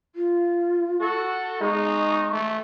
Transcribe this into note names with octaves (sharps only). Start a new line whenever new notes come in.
F4
F#4 A4
G#3 D#4 C#6
A3